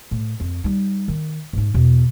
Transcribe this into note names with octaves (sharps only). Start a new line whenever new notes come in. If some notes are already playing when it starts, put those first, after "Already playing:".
A2
F2
G3 D#4
D#3
G#2 D#4
E2 B2